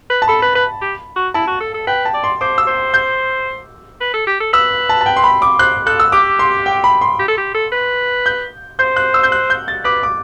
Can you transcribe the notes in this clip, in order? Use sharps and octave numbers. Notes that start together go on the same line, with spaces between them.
B4
A5
A4 B5
B4
B4
G4
F#4
E4 A5
F#4
A4
A4
B4 G5
A5
D5
C6
C5 D6
E6
C5
G6
B4
A4
G4
A4
B4 E6
A5
A5
G5
C6
B5
D6
C5 F#6
A4 F#6
E6
G4 D6
C6
G5
B5
C6
G4
A4
G4
A4
B4
G6
C5 G6
F#6
E6
G6
F#6
G6
A6
B4 D6
D6